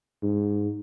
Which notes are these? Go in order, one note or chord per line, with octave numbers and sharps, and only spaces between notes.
G#2